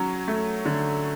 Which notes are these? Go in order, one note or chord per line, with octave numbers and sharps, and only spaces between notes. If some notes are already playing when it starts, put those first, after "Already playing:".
Already playing: F#3 C#4
A3
D3